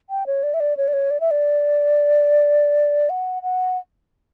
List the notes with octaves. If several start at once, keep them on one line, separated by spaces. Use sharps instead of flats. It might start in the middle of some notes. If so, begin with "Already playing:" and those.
G5
C#5
D5
E5
D5
C#5
D5
C#5
D5
E5
D5
F#5
F#5